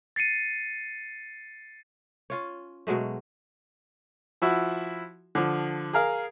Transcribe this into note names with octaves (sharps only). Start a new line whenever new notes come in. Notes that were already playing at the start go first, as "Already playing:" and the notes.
A6 C7 C#7 D#7
C#4 F4 C#5
B2 F#3 G#3 A3
F3 E4 F#4
D3 F3
G#4 A#4 F5